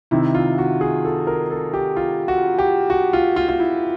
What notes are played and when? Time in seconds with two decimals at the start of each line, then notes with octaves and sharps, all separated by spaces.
0.11 C3 D#3 E4
0.35 F4
0.58 F#4
0.81 G#4
1.05 A4
1.27 A#4
1.50 A4
1.73 G4
1.96 F4
2.28 F#4
2.58 G4
2.90 F#4
3.13 F4
3.36 F4
3.49 F4
3.60 E4